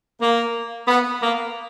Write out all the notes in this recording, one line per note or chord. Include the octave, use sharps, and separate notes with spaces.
A#3
B3
A#3